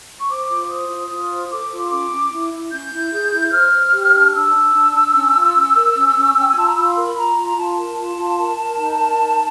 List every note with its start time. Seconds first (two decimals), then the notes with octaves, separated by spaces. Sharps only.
0.20 C#6
0.29 C5 D6
0.49 F4
0.69 C5 D#6
0.89 F4
1.09 F4 D#6
1.29 C5
1.50 A4 D6
1.70 F4
1.90 C#4 D6
2.11 C#4
2.31 E4
2.51 E4
2.71 C#4 G6
2.91 E4
3.12 G#4
3.31 E4
3.52 C5 F6
3.72 C5
3.92 G4
4.13 D4
4.33 D4 E6
4.53 D4
4.73 D4
4.94 D4
5.14 C#4
5.34 F4
5.54 C#4
5.74 A#4
5.95 C#4
6.15 C#4
6.35 C#4 G5
6.47 G#5
6.55 F4 A5
6.66 A#5
6.75 F4 B5
6.95 A#4
7.16 F4 A#5
7.36 F4
7.45 A#5
7.56 F4 A5
7.77 A#4
7.97 F4
8.17 F4
8.37 A#4
8.58 A#4
8.77 D#4
8.98 A#4
9.18 D#4